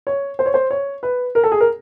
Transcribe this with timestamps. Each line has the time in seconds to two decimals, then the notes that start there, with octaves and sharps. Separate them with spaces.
0.07 C#5
0.39 C5
0.46 C#5
0.54 C5
0.71 C#5
1.03 B4
1.35 A#4
1.44 A4
1.52 G#4
1.60 A#4